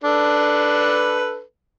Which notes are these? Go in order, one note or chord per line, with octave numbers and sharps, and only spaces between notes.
D4 A4 B4